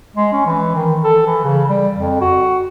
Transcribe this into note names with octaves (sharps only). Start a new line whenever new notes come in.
G#3
C#4
E3
D#3
A4
E3
C#3
G3
F2
F#4